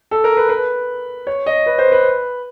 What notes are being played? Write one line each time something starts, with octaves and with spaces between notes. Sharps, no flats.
A4
A#4
B4
B4
C#5
D#5
B4
C5
B4